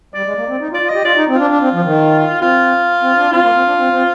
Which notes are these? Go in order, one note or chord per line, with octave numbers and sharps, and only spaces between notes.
G3 D5
G#3
A#3
C4
D#4
F4
D5
F4
G4 D#5
F4 D5
D#4
C4
D4 F4
D4
C4
F3
D#3
C4 F4
C4
D4
C4 F4
A#3
C4
D4
C4
C4